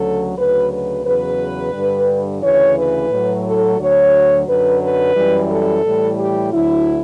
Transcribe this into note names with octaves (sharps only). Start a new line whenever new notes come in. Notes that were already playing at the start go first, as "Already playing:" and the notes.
Already playing: D2 C#3 F#3 A4
D2 C#3 F#3 B4
B4
E2 C#3 F#3 B4
G2 D3 G3
D2 C#3 E3 C#5
B4
A2 F#3
A4
D2 D3 F#3 C#5
F#2 D3 F#3 B4
B4
F#2 E3 G3
A4
A2 E3 G3
G4
D2 D3 F#3 E4